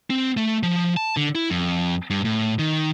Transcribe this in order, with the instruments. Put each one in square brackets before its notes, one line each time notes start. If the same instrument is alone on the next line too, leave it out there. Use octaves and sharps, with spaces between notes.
[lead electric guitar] C4
A3
F3
A5
D3
E4
F2
G2
A2
D#3